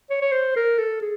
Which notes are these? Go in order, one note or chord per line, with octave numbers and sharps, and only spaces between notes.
C#5
C#5
C5
A#4
A4
G#4